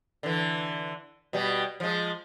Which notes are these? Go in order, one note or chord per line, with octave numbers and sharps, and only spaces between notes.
D3 E3
B2 G3
F3 G#3